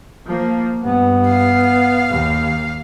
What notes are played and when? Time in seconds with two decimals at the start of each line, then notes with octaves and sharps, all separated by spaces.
0.26 F3 A#3
0.81 G2 B3
1.28 F5
2.10 D#2